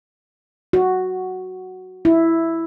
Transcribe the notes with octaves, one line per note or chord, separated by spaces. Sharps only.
F#4
E4